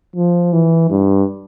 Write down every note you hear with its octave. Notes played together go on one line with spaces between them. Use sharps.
F3
E3
G2